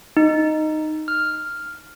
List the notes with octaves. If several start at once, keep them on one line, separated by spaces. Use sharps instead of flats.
D#4
F6